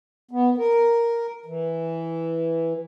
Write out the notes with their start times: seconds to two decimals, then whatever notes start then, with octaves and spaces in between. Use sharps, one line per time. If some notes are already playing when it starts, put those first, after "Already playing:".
0.31 B3
0.58 A#4
1.46 E3